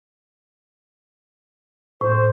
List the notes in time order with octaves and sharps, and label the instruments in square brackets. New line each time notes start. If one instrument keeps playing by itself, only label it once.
[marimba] A2 [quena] C5